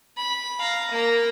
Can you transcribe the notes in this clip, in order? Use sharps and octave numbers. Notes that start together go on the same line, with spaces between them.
B5
F5 A#5
A#3 A#5